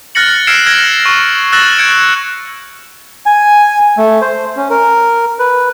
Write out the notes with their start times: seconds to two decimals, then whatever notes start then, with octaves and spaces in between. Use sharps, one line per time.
0.15 F6 F#6 A6 A#6 C#7 F#7
0.47 E6 F6 G#6 C7 D7 E7
0.66 F6 G#6 A#6 D7 F#7
1.05 C#6
1.52 E6 F#6 A6 A#6 E7 F#7
1.78 G6 G#6 C#7 D7
3.26 G#5
3.97 A3
4.21 C5
4.56 C#4
4.70 A#4
5.39 B4